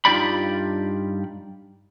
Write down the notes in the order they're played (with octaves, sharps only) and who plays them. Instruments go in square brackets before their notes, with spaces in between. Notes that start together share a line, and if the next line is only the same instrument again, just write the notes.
[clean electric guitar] G2 D#4 F4 G4 D5 B5